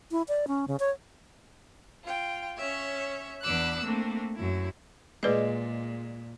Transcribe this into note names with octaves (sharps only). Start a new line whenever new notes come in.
E4
D5
C#4
C#3
C#5
F4 G5
C#4 C#5 E5
E2 B3 D4 D6 E6 F#6
A3 A#3 C4 D4
F#2 E4
A#2 G#3 G#4 B4 D5 D#5